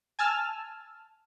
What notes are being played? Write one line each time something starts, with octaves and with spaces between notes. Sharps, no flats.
G#5 A5 E6 F6